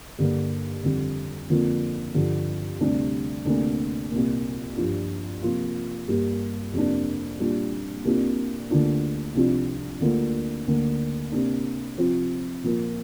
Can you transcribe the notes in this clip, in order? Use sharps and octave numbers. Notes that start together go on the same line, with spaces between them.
G2 D3 A#3
F2 D3 G3
F2 D3 F3 A#3 F4
G2 D3 F3
D2 C3 G3 D4
D2 C3 A#3 D4
C2 A#2 A#3
G2 F3 D4 F4
C3 F3 A#3 F4
G2 G3 A#3
F2 C3 A#3 D4
A#2 G3 D4 F4
C2 C3 A#3 D4 F4
D2 D3 A#3 D4 F4
C2 C3 F3 D4 F4
D2 D3 A#3 F4
D2 D3 A#3
C3 A#3 D4
C3 F3 C4 F4
A#2 F3 A#3 F4